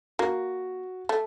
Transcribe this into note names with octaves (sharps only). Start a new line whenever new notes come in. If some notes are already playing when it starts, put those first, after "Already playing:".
A#3 F#4
A3